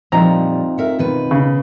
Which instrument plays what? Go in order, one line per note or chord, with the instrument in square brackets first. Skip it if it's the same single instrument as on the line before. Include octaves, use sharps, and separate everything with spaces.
[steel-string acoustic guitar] A#2 F3 G3 [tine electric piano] C4 D#4 F4 [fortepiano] A#5
[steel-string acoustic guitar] A#4 E5 F#5
B2 D#3 B4
[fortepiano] C#3